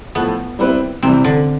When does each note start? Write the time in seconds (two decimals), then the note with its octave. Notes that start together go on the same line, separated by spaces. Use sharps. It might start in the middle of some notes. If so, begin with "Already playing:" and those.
0.15 A2 F3 A3 B3
0.59 G3 C4 E4 B4
1.03 C3 E3 G3 C4
1.24 D3